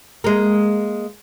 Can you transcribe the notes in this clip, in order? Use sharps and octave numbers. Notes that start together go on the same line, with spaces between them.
G#3 A#3